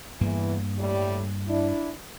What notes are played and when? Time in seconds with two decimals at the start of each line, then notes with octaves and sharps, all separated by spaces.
0.21 E2 G2 E3 A#3
0.79 A2 G3
1.48 D4 E4